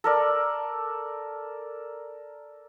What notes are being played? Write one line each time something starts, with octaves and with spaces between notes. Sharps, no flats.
A4 A#4 D5